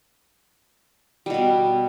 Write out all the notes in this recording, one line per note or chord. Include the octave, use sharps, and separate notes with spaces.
B2 G3 B3